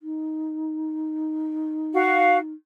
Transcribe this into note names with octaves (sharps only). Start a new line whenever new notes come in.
D#4
F#4 F5